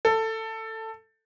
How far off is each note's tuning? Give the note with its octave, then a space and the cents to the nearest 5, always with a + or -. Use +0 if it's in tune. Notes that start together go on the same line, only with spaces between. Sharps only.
A4 +15